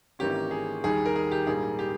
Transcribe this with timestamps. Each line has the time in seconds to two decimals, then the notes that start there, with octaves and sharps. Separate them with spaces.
0.19 G#1 G#2 E3 A#3 C#4 G4
0.51 G#4
0.84 D#2 D#3 G3 G#4
1.06 A#4
1.16 G#4
1.31 G4
1.47 A#1 G#2 G3 A#3 G#4
1.79 G4